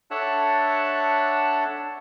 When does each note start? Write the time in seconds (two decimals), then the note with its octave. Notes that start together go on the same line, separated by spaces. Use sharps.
0.11 D4 A4 C#5 E5 F#5 A5